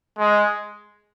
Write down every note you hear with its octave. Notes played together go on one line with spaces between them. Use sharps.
G#3